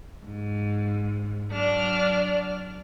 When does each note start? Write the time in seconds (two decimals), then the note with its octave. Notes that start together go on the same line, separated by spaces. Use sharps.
0.25 G#2
1.50 F#3 D4 D5 F6